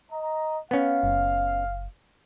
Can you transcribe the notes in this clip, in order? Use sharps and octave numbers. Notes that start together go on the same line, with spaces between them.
D#5 A#5
B3 C#4 F5
F#1